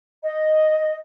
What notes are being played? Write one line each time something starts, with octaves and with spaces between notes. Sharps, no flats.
D#5